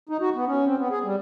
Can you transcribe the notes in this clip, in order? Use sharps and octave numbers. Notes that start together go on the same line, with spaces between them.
D#4
F#4
B3
C#4
C4
B3
G#4
G3